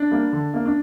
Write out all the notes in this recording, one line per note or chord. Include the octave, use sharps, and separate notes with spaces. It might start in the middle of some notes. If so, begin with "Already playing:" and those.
Already playing: D4
G3 A#3
D3
A#3
D4